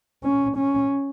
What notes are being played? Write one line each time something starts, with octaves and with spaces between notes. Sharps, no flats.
C#4
C#4